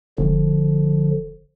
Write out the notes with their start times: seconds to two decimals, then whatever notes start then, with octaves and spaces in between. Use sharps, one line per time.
0.18 E1 D3 F3